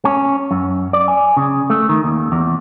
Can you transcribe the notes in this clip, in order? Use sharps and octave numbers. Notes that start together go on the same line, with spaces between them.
C#4
F#2
D5
G#5
C#3
A3
D#3
D#2
E2